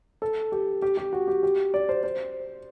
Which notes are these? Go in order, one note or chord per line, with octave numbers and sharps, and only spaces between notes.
A4
G4
G4
G4
F#4
G4
G4
D5
C5
C5